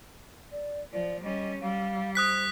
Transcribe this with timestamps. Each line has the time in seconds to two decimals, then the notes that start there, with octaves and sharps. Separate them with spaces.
0.51 D5
0.93 F3 D5
1.23 G3 C#4 D#5
1.61 G3 F5
2.15 C5 D#6 F#6 B6